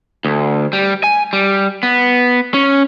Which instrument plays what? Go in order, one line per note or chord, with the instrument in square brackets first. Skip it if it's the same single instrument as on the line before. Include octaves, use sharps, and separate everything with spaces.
[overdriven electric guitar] D2
G3
G#5
G3
B3
C#4